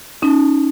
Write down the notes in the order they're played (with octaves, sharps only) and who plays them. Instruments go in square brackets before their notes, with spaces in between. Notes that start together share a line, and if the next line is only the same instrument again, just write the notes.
[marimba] C#4 D#4